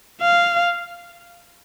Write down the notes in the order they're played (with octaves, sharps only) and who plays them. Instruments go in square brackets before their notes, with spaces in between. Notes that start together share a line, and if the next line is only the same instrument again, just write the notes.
[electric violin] F5